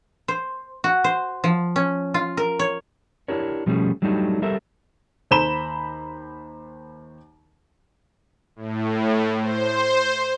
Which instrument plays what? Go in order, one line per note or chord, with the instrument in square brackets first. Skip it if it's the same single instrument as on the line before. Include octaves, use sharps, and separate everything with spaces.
[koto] C5
F#4
C5
F3
C#4
F4
A#4
C#5
[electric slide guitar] D4 E4 G4 A#4 C#5
B2 F3 G3 A3 C#4 G#4
F#3 G3 A3 D4 D#4 G4
G3 G4 A4 A#4 C5 E5
[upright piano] D#2 C5 A#5 B5 E7 G7
[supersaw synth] A2
C5